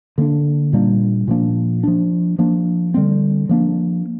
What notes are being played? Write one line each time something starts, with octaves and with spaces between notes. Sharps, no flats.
D3 A#3 D4
A#2 G3 A#3 D4
A#2 F3 A#3 D4
F3 D4
F3 A#3 D4
D3 G3 C4
F3 A#3 D4